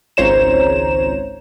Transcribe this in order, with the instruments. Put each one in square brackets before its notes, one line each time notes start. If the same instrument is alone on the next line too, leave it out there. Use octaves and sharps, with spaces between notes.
[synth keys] G#1 C#2 C5 C#5 A#5 E7